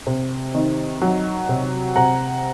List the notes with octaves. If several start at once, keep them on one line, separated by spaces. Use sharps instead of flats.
C3
D#3
F#3
C3
C3 F#5 A#5